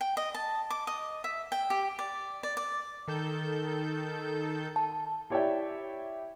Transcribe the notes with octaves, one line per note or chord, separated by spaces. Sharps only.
G5
D#5
A5
D6
D#5
E5
G5
G4
D5
D5
D5
D#3 A4 G6
A5
E4 G4 C#5 D5 E5 G5